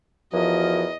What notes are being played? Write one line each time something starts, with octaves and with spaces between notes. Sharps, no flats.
E2 F3 F#4 A#4 D#5